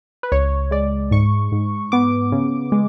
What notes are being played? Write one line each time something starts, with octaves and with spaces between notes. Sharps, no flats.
B4
C#2 C#5
G#3 D5
G#2 C#6
G#2
B3 D6
C#3
G#3